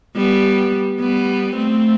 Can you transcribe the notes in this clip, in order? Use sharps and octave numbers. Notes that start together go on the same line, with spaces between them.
G3 B3
G3 B3
A3 C4